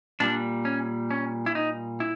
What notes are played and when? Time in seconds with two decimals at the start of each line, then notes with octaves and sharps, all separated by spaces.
0.20 A#2 G3 D4
0.65 C#4
1.11 C#4
1.46 E4
1.55 D#4
2.00 E4